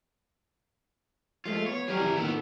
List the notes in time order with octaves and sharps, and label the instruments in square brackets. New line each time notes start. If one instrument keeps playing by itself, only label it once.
[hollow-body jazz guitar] F3 G#3 A3 [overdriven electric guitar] F4
[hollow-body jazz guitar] B3 [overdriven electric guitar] C#5
[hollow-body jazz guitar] F#3 G3 G4 [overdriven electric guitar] G#4 A#4
[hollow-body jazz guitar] C3 E3 G3
[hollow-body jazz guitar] A#2 D#3 [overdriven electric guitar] B3 A4